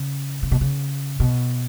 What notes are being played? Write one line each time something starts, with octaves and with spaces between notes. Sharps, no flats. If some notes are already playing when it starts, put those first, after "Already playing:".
Already playing: C#3
C#3
B2
C#3
B2